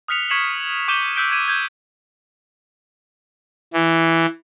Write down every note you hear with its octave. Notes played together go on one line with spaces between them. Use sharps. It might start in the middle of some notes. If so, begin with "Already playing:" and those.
D#6 F6 F#6 B6 C#7 F7
C#6 G#6 B6 C#7 E7 F#7
C#6 D6 G6 D#7 E7 G7
E6 F#6 G6 B6 D7 G7
G6 G#6 D#7
G6 G#6
E3